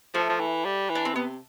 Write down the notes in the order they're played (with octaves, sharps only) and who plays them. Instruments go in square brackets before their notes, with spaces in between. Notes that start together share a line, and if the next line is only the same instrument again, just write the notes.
[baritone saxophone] F3 [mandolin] A3
[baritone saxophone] F3
E3
G3
E3
[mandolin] D4
C4
[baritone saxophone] C3 [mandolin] B3